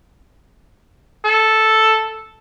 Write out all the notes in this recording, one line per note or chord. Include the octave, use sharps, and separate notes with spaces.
A4